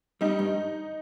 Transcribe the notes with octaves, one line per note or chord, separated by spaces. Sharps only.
G3 D#4
G2